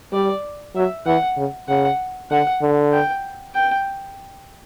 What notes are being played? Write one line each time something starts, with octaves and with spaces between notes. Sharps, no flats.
G3 D5
F#3 E5
E3 F#5
C#3
C#3 F#5
D3 F#5
D3
G5
G5